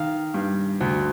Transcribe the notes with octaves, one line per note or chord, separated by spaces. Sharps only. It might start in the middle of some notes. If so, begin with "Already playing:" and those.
Already playing: D#3 F5
G2
D2